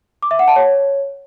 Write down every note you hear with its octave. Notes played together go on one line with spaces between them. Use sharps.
D6
E5
F#5
A5
C#5